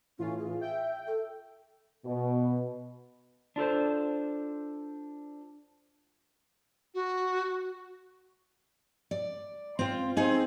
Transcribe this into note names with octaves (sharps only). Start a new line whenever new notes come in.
A2 E3 C#4 F4
G#4
E5 G5
A4
B2
D4 F4 A4 C5
F#4
D5
C4 F4
C4 D#4 G#4